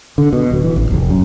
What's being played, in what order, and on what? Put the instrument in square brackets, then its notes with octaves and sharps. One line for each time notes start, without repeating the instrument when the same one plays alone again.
[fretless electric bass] D3
B2
D1
E3
A1
F1
F#2